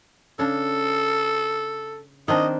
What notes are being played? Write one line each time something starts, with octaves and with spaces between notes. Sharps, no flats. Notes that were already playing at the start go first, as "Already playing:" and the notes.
C#3 D4 A4
D#3 C4 D4 D#5